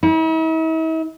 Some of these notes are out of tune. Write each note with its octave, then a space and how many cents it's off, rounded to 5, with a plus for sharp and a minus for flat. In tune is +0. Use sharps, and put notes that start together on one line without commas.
E4 -45